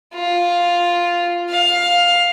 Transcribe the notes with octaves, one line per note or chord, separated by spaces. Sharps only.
F4
F5